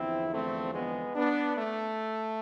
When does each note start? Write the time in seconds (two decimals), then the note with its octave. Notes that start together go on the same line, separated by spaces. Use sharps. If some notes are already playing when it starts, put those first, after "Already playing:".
Already playing: E2 D3 F3 C4 E4
0.32 A3 C4
0.74 G#3 B3
1.15 B3 D4
1.56 A3